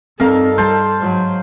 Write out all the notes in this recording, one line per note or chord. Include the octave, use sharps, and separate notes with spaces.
G2 C4 D#4 A4 A#4 F5
G3 C5 A5
G#2 F#3